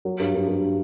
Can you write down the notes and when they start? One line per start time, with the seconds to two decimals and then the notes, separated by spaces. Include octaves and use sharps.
0.05 F#3
0.19 G2
0.34 G2
0.48 G2